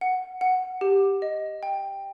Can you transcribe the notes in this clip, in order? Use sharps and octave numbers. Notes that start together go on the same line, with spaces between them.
F#5
F#5
G4
D#5
G5